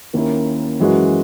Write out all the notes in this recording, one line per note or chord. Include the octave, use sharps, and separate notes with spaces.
D#2 D#3 A#3 C#4 E4
F#2 E3 G#3 C#4 F#4